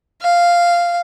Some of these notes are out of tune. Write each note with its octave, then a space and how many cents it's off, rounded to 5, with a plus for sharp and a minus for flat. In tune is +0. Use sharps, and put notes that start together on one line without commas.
F5 -5